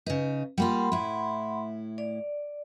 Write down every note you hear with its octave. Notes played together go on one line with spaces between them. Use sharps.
C#3 D#4 B4
G3 A#3 F4 F#5 B5 C6
A2 E4
D5